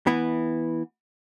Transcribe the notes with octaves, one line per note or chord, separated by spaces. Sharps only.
E3 B3 E4